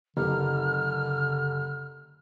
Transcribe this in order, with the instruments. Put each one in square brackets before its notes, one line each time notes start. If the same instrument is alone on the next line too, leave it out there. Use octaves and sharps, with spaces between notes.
[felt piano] F#1 G4 [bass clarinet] D3 [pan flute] F6